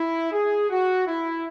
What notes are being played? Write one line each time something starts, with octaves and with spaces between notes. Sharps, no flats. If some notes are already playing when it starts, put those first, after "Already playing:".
Already playing: E4
G#4
F#4
E4